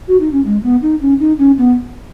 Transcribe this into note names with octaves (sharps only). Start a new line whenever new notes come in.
F#4
D#4
C#4
G#3
B3
D#4
C#4
D#4
C#4
B3